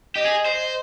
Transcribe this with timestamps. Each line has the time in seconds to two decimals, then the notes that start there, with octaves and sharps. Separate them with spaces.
0.15 G4 D#5
0.26 G#4
0.45 C5 D#5